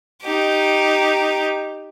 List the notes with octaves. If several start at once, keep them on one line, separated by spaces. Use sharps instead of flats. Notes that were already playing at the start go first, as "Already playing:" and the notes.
D#4 G4